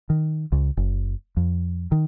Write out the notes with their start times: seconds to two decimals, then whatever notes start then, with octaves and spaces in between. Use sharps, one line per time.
0.10 D#3
0.52 C#2
0.77 F#1
1.37 F2
1.92 D#3